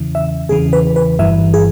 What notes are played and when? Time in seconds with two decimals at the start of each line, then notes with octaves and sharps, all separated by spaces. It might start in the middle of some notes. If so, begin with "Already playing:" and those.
Already playing: E2 C#3 E3
0.15 E5
0.49 E2 C#3 E3 G#4
0.73 B4
0.96 B4
1.19 G1 G2 E3 E5
1.54 G#4